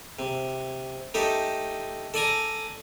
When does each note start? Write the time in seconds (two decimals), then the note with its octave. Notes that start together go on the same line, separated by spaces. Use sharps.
0.19 C3
1.14 A3 D#4 G4 A4
2.14 A4 D5 G#5 A#5